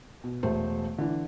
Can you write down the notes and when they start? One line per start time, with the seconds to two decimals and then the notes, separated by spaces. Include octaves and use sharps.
0.24 B2
0.43 E1 A3 C5
0.98 D3 E3